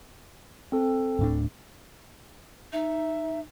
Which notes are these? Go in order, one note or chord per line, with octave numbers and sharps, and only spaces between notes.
C4 A4
D1 A2 D4
D#4 E5